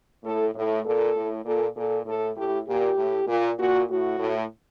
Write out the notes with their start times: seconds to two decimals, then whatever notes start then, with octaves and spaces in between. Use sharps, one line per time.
0.23 A2 A4
0.55 A2
0.84 A#2 A4
1.15 A2
1.45 A#2 A4
1.75 A#2 A4
2.06 A2 A4
2.36 A2 G4
2.66 A#2 G4
2.97 A2
3.27 A#2
3.58 A#2 F#4
3.89 A2 F#4
4.19 A2